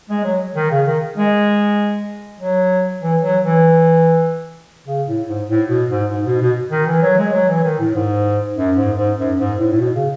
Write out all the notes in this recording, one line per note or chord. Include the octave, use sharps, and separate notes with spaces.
G#3
F#3
D#3
C#3
D#3
G#3
F#3
E3
F#3
E3
C#3
A2
G#2
A2
B2
G#2
G#2
B2
B2
D#3
E3
F#3
G#3
F#3
E3
D#3
A2
G#2
F#2
G#2
G#2
F#2
G#2
A2
A2
B2
C#3